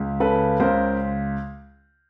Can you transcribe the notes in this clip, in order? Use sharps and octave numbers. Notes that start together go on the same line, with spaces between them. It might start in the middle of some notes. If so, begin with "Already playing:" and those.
Already playing: C#2
C#3 A4 B4
C#2 A#4 C5